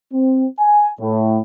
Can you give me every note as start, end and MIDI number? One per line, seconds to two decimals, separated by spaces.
0.13 0.46 60
0.59 0.89 80
1.01 1.40 45